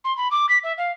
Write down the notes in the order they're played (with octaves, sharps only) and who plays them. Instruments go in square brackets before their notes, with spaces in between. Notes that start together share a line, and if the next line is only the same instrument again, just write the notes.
[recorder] C6
B5
D6
B6
E5
F5